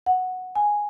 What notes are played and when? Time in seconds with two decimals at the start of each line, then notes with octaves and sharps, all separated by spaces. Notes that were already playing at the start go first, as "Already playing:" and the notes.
0.06 F#5
0.56 G#5